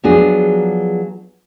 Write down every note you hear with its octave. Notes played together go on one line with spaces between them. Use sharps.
F3 F#3 B3 D4 G#4